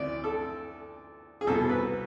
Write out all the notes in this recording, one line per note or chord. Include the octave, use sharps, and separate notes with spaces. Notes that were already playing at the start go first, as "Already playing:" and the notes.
Already playing: D2 C3 E3 D5
A4
G#4
C2 B2 A4
B4